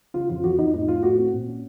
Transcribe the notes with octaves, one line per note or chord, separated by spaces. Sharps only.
C#3 F4
F2 F4
F2 F#4
F2 D#4
A2 D#4
A2 F4
A2 F#4
C4
A#2
C#4